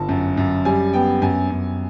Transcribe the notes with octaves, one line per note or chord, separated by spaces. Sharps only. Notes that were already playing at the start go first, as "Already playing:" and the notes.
Already playing: G1 A5
F#2
F#2
G3 G#5
B3 G5
F#2 G#5
F#2